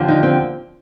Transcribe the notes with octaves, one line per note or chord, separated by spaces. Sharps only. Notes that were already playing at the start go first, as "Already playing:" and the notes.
Already playing: D#2 D3 F3
D#4
C4